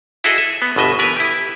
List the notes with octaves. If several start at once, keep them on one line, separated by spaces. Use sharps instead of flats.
E4 F#4 G#4 A4 D#5
E5
B3
G1 B2 D#5 E5
E3 B3 A#4 B4 G#5
E4 G4